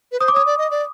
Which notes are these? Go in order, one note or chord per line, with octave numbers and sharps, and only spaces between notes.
B4
C5 D#6
D6
C#5 D#6
D5
D#5
D5